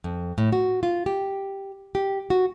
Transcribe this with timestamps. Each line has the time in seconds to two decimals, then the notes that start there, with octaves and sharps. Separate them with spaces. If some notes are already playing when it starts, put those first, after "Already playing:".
0.04 F2
0.38 A2
0.52 F#4
0.83 F4
1.06 G4
1.95 G4
2.30 F#4